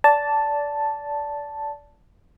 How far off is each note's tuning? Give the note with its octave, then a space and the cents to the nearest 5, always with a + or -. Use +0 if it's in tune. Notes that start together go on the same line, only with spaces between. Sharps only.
D5 -20 A5 +0